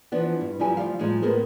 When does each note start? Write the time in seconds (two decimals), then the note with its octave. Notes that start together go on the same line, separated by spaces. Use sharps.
0.12 E3 F3 B3 D4
0.41 G2
0.59 G2 F3 F#3 E4 G4 G#5
0.77 D2 F3 G3 F5
0.99 A2 F3 F#3 G#3 D#4
1.22 A2 B3 G#4 A#4 C5